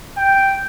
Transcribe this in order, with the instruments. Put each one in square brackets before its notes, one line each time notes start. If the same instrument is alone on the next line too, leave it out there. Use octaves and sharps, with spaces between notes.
[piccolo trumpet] G5